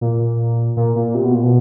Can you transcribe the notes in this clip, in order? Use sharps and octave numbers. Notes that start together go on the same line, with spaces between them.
A#2
A#2
A#2
C3
B2
A#2
B2